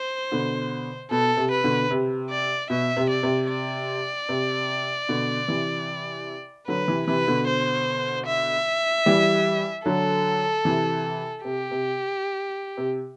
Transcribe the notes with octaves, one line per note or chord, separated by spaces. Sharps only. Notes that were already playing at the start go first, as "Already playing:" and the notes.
Already playing: C5
B2 D3
B2 A4
C3
B4
B2 D3
C3
D5
B2 E5
C3
D5
C3
D5
C3
B2 D3
C3 E3
D3 F#3 B4
C3 E3
C3 E3 B4
B2 D3
C5
E5
E3 G3
D3 F#3 A4
C3 E3
C3 G4
C3
C3